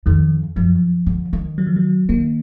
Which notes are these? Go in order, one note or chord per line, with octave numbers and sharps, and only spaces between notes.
F2 D#3
F#2 F3
D3
D#3
F#3
F3
F#3
D#3 A#3